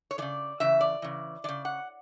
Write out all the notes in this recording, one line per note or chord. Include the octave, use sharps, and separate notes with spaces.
C#5
C#3 E3 D5
C#3 E3 E5
D5
C#3 E3
C#3 E3 D5
F#5